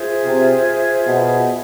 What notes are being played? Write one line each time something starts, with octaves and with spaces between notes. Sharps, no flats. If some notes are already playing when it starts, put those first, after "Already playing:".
Already playing: F4 G#4 C5 E5
C3
B2